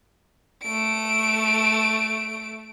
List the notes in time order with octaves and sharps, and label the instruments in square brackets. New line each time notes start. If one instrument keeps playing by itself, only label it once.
[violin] A3 D7